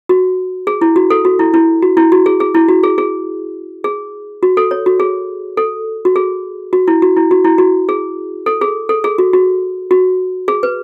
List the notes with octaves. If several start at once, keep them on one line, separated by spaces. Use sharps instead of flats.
F#4
G#4
E4
F#4
A4
F#4
E4
E4
F#4
E4
F#4
G#4
G#4
E4
F#4
G#4
G#4
G#4
F#4
A4
C#5
F#4
G#4
A4
F#4
G#4
F#4
E4
F#4
E4
F#4
E4
F#4
G#4
A4
G#4
A4
G#4
F#4
F#4
F#4
G#4
B4